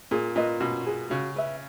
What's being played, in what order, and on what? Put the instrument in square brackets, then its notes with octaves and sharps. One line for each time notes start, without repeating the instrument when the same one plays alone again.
[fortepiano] A#2 [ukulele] G#4
[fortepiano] A#2 [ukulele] B4 D#5
[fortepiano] B2 [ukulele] C#4
[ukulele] G#4 B4
[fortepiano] C#3 [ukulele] F#4
[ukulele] B4 E5